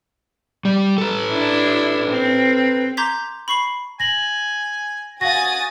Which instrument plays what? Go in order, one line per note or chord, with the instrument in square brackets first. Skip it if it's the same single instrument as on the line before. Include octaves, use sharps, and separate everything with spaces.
[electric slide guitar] G3
A4 B4
[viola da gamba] D4 E4
C4
[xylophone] A#5 C6 D6 G6 G#6 B6
B5 C#6 C7 F#7
[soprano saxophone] G#5 [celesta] A#6 F#7
[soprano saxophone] F#4 [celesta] F5 A#6 [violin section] G#5 D#6 A6